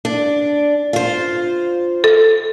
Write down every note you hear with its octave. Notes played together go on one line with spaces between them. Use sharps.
D4
F4 C5
A4